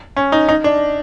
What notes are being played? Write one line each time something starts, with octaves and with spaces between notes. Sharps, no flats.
C#4
D#4
D#4
D4